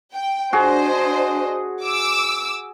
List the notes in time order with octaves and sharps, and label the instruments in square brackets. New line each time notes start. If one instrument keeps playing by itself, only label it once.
[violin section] G5
[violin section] D4 C5 D#5 [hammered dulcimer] F#4 G#4
[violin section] D6 E6